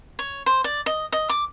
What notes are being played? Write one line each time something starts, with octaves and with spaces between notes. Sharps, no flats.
C#5
C5
D5
D#5
D#5
D6